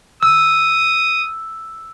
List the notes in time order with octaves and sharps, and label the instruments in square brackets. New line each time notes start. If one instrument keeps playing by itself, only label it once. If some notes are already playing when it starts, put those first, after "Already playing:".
[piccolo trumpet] D#6 [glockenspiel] E6